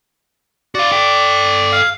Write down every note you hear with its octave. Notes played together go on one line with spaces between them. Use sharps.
F#4 D5 F5
A4 G5
F5